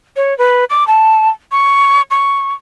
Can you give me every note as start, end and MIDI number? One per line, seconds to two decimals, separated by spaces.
0.16 0.36 73
0.38 0.65 71
0.70 0.86 86
0.87 1.29 81
1.52 2.02 85
2.11 2.54 85